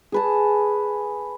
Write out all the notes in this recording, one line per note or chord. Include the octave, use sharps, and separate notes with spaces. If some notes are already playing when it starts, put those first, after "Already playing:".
G#4 B4 A5